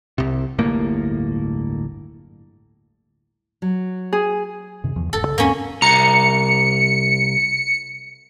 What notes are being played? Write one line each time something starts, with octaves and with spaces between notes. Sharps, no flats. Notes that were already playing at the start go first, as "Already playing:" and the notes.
C2 C3
D1 G1 A2 A#3
F#3
G#4
F#2 C3 D#3
E2 F3
D#1 G2 A4
C2 C#3
E2 G#2 A#3 C4 C#4
C2 A#5 C#7